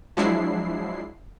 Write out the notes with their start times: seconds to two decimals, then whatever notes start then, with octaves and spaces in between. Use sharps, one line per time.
0.17 F3 F#3 G#3 D4 E4 C7